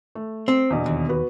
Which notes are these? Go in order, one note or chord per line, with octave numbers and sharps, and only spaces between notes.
A3
C4
E2 B2 D3
D#2
B3 F#4 B4